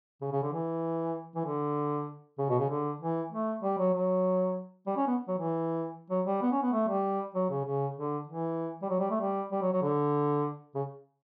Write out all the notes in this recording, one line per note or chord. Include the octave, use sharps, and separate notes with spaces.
C#3
C#3
D3
E3
E3
D3
C#3
B2
C#3
D3
E3
A3
G3
F#3
F#3
G3
C#4
B3
F#3
E3
F#3
G3
B3
C#4
B3
A3
G3
F#3
C#3
C#3
D3
E3
G3
F#3
G3
A3
G3
G3
F#3
F#3
D3
C#3